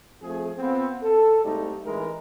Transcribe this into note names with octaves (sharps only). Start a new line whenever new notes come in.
F3 A3 C4 G#4
B3 C4 F4
A4
C2 G#2 G3 A3 D#4 G4
A1 E3 G#3 D#4 A#4